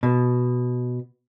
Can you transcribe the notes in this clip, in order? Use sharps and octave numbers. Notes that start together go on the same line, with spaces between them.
B2